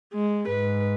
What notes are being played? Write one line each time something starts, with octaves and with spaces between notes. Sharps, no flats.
G#3
G#2 B4